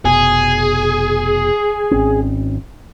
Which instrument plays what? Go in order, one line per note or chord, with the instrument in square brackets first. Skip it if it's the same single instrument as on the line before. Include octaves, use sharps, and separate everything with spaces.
[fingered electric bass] F1 B2 [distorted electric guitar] G#4
[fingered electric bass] G#1 C4 C#4